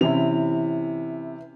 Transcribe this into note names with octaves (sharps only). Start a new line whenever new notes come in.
C3 E3 C#4 E4 F7